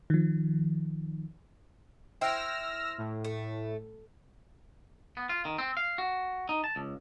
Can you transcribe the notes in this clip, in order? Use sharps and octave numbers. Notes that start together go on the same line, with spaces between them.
D#3 F3
E4 C5 G5 E6 F6 A#6
A2
A3
B3
F4
D#3
C4
F5
F#4
D#4
A5
C#2